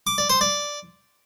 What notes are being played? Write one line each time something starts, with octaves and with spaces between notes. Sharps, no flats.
D6
D5
C5
D5